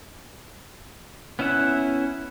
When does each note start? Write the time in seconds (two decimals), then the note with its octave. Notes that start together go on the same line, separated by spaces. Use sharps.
1.39 B3 C#4 E4 E5 F#5